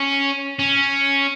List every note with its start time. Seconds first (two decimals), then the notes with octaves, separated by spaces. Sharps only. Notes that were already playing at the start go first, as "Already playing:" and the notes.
Already playing: C#4
0.59 C#4